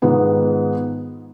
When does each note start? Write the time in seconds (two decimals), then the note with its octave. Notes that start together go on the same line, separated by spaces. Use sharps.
0.02 G#2 D#3 G#3 B3 F4